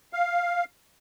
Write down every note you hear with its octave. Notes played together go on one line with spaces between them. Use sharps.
F5